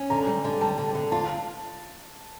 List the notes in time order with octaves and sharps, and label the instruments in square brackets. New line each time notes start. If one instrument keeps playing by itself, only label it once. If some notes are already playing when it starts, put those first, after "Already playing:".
Already playing: [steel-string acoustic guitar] C#4
[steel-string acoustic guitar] D3 [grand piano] A#5
[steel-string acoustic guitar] G3
D3
[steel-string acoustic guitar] G3 [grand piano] A5
[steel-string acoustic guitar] D3
D3
[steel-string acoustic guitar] F4 [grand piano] A5